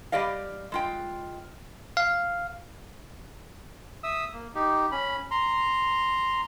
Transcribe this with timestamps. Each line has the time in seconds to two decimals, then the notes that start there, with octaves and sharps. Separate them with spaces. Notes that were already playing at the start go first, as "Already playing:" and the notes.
0.12 G3 G#3 G4 D5 D#5 F5
0.72 G#3 F4 G5
1.97 F5
4.03 E5 D#6 E6
4.33 A#3
4.55 D#4 G4
4.91 C#4 B5
5.31 A#5 C6